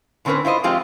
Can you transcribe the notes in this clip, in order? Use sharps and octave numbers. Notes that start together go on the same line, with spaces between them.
A2 D3 C4 C#4 A#4 B4
E4 F4 C5 D#5
F3 G#3 C4 F4 G4